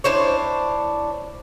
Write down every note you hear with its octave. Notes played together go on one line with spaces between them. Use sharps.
D4 E4 C5 C#5